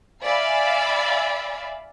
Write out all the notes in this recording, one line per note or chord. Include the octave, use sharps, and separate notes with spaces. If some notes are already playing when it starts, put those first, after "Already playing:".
D5 E5 F5 G#5 B5